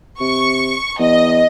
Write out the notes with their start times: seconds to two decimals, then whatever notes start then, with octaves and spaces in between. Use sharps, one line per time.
0.20 C3 C#6
0.99 E2 D#5